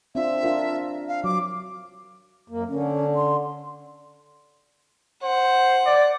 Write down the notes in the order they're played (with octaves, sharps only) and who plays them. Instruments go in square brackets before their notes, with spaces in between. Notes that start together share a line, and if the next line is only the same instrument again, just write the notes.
[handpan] C4 D4 F4 [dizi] E5
[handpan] D4 F4 A#4
[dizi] F5
[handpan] F#3 [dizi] D6
[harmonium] F#2 A#3
[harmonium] D3 [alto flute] C#4
[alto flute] C6
[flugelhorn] C5 [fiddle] F#5
[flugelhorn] D5